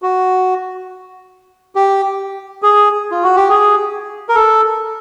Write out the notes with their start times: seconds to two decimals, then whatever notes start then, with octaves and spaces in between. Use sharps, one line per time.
0.02 F#4
1.75 G4
2.62 G#4
3.11 F4
3.23 F#4
3.36 G4
3.49 G#4
4.29 A#4
4.35 A4